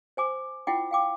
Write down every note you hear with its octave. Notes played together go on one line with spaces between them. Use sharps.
C5 G#5 D6
E4 F4 F#5 G5 D6
F5 G5 D6